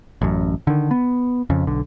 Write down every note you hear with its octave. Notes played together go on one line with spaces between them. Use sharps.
A1 F#2
D3 D#3
B3
F2 C#3
B1 D3